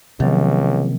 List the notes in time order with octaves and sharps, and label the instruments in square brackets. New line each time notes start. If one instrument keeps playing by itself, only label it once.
[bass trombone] C#2 [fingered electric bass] C3 A#3 [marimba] D#3 F3 F#3